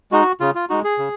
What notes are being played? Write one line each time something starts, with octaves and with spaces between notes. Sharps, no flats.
G#3 D#4 F#4
C#3 F4
F4
G#3 D#4 F#4
G#4
C#3